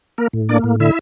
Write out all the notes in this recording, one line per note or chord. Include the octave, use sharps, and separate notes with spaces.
A#3 A#4
A2
A#3 D4 D5
A2
D3 E4 E5